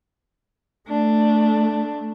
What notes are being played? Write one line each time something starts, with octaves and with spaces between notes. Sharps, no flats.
A3 D4